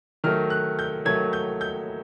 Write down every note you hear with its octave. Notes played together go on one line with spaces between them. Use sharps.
D#3 F#3 A3 F6
F#6
G6
D#3 F#3 A3 G#6
G6
G6